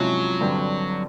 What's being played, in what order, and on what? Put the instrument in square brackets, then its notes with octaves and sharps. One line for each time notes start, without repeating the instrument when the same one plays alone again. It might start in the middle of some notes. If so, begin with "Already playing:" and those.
Already playing: [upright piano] C3 F3 G#3 C#4 E4 [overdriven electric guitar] F#3
[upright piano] G2 D3 G3 C4